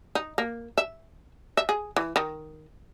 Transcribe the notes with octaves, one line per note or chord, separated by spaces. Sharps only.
D#4
A#3
E5
E5
G#4
E3
D#3